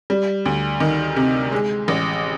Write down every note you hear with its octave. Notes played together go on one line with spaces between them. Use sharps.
G3
D2
D#3
C3
G#3
A1